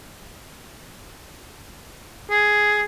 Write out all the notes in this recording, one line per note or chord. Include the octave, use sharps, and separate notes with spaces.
G#4